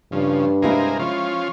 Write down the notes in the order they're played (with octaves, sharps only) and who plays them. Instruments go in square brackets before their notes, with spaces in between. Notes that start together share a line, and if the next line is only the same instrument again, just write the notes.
[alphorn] G2 [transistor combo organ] C#3 F3
[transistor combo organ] C3 G#4 A#4 [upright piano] G#3 E4 F5
[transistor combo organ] F3 C#4 F4